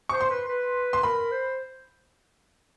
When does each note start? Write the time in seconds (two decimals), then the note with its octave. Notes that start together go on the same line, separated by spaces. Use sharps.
0.09 C5 C#6
0.21 C6
0.30 B4
0.48 B4
0.93 C6
1.03 A#4 B5
1.31 C5